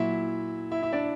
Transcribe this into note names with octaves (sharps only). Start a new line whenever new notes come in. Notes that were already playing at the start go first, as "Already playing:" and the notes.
Already playing: A#2 F#3 E4 E5
E4 E5
E4 E5
D4 D5